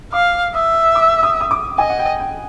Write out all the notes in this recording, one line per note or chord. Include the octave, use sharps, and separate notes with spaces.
F5 D6
E5 D#6
D6
D#6
D#6
D6
D#5 G#5
F#5
G5
G5